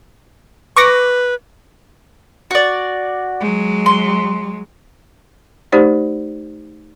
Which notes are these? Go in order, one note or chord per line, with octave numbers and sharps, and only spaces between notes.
B4 C#6 D6 A#6
F#4 D5
F#3 G#3
C6
A3 D#4 G4 C5 D5